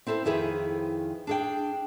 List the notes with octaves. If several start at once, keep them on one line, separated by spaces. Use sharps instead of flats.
C4 E4 A4 B4 C5
F2 D#3 E4 G#4 B4
D4 G#4 G5